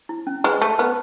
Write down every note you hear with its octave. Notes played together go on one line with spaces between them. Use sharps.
E4
C#4
G#3 B4
A3 A5
B3 B4